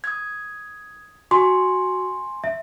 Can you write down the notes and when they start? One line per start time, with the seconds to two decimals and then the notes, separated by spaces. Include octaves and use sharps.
0.04 D#6 G#6
1.31 F#4 G#5 C6 C#6
2.44 E5